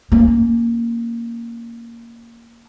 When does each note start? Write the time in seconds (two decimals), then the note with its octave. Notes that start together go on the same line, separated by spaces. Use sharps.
0.12 A#3 C#4